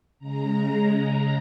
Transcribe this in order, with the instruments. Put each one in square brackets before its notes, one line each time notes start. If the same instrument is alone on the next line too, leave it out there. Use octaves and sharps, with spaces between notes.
[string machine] C#3 G#3 A#5